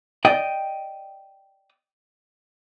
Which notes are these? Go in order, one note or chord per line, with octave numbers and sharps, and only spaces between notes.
D5 D#5 G5